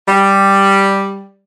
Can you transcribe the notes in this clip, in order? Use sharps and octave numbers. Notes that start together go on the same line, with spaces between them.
G3